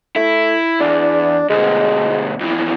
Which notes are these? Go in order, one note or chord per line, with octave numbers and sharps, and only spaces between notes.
A3 E4
E2 D4
D2 B2 G#3
F2 E3